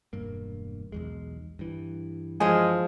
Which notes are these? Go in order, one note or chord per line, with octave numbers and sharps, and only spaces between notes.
E1 G2 A#3
B1 E2 G#3
G2 E3
F3 G#3 G#4 G#5